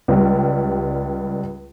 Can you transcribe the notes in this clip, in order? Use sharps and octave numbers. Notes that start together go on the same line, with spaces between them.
C#2 G3